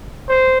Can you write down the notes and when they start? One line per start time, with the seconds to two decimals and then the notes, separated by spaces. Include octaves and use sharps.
0.29 C5